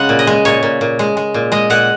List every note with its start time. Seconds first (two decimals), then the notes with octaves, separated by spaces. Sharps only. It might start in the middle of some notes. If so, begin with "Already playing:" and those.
Already playing: C#3 G#3 F#5
0.09 A#2
0.19 D#5
0.27 G#3
0.45 A#2 C#5
0.63 A#2
0.81 A#2
0.99 G#3
1.17 G#3
1.34 A#2
1.52 G#3 D#5
1.70 A#2 F#5